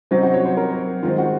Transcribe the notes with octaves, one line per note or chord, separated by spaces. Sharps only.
C3 F#3 C4 D#4
F#4
C#5
C5
A#4
D#3 G#3 C4 F4
F#4